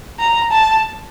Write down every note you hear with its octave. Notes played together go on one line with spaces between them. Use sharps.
A#5
A5